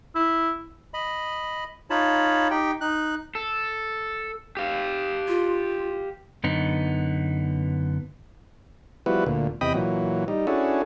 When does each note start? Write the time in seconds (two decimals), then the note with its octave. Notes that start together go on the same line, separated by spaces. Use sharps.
0.15 E4
0.94 D#5 B5
1.90 D#4 F4 C#5 A5 B5
2.51 D#4 G4 G5
2.81 D#4 F#6
3.35 A4
4.57 G4 F5
5.28 F4
6.44 F#2 D3 B3 D#4
9.06 F3 G3 B3 E4 F#4 B4
9.26 D2 A#2
9.61 E2 C3 D#5 G5 B5 D#6
9.74 A#2 E3 F#3
10.28 G3 D#4
10.47 C#4 D4 E4 F#4 G#4 A4